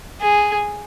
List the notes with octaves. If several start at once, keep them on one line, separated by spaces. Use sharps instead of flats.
G#4